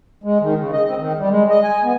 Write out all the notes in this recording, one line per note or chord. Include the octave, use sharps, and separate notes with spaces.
G#3
D#3
C#3
D#5
C4
D#3
G3
G#3
D#5
G#5
B3